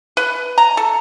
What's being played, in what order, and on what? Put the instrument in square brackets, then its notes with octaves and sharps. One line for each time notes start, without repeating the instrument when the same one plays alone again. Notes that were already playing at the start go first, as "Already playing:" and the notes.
[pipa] B4
A#5
A4